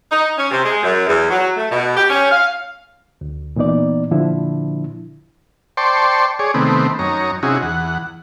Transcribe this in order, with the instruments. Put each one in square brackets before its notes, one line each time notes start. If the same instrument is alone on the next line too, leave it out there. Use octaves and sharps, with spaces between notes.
[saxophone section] D#4
C#4
C3
G#3
F#2
E2
F#3
A3
B2
G4
C#4
F5
[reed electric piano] D2
A#2 E3 B3 D#4 D5
A#2 D3 F3 D4 E4
[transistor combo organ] C5 D5 G5 A5 C6 C#6
G#4 C#5 D5
C3 D#3 A3 B3 C4
F#2 D#4 C#5 A#5
C3 C#4 D#4 E4 F#4 G#4
E2 F#5